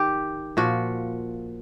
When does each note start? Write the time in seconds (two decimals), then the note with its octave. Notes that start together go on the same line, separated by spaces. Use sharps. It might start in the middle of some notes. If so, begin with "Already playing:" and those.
Already playing: D#3 G4
0.57 A#2 F3 F#4